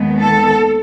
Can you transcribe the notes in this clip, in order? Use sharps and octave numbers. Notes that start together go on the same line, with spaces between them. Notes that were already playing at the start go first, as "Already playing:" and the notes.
Already playing: D#2 D#3 G#3 B3
A4